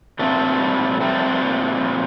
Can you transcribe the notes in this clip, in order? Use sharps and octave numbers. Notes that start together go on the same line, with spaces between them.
A#2 A3 C4
G3
G3 A3 C4
A#2
A#2